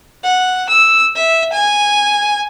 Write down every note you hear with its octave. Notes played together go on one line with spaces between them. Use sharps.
F#5
E6
E5
G#5